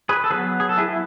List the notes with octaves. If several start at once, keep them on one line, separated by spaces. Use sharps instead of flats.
G#4 B4
A4
F#3 B3 G#4 B4
G#4
A4
E4 G#4
E4